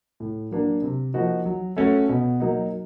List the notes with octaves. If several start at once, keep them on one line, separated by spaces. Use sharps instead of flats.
A2
F#3 A#3 D4
C3
F3 A#3 D#4 F#4
F#3
A3 C#4 F#4 A4
B2
F#3 A#3 D#4